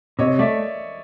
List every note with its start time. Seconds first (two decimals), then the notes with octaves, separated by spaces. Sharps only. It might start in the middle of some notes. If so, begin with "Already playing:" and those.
0.19 C3 C#5 D#5
0.39 A3 D5 E5